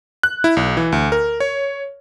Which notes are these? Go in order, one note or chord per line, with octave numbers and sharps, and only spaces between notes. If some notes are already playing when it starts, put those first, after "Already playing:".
F#6
E4
B1
E3
D2
A#4
C#5